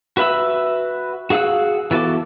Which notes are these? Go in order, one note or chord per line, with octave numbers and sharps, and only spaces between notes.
F#4 B4 E5 B5 E6
F#4 G#4 F5 F#5 E6
E3 B3 F#4 A4 D6